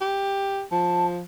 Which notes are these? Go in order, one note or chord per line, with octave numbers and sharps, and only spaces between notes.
G4
F3 A5